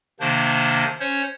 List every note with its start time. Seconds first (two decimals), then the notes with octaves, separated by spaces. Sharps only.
0.20 C3 D#3 A#3 D4 C5
1.00 C#4 C5 C#5